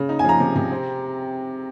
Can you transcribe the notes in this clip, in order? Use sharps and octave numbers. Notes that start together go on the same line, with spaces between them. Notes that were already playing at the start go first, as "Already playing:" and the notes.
Already playing: C#3
D#4
G#5
F3 A#5
C3
C3
C4